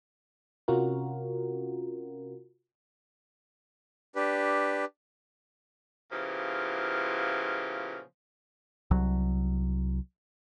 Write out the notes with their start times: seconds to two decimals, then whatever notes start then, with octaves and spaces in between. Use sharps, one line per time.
0.68 C3 C#4 F4 F#4 A#4
4.16 D4 G4 B4
6.12 A#2 C#3 F3 B3 E4 G4
8.91 C2 F#3